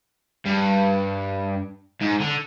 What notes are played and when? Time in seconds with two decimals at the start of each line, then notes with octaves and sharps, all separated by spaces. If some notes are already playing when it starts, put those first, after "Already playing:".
0.46 G2
2.01 G#2
2.20 D3